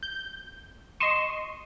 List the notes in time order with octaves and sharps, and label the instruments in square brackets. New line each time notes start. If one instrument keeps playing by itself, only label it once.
[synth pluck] G6
[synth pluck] D#5 C6 C#6 [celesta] D#7 E7